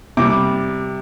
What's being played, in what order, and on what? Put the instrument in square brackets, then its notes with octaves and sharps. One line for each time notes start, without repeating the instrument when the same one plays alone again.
[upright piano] C3 G3 D6